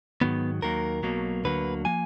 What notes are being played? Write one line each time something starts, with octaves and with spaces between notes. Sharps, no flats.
G#2 D#3 F#3 B3
D#2 D#3 F#3 A#3 A#4
B1 B2 F#3 A#3
D2 D3 F#3 A#3 B4
F3 A#3 G#5